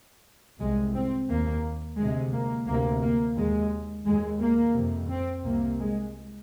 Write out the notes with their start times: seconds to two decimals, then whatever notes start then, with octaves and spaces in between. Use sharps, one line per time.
0.60 C2 C3 G#3
0.95 C4
1.29 D#2 A#3
1.97 D2 C3 G#3
2.32 A#3
2.67 D2 C3 A#3
3.01 A#3
3.36 D#2 G#3
4.05 D#2 G#3
4.41 A#3
4.75 F2 C3
5.09 C4
5.45 C2 C3 A#3
5.79 G#3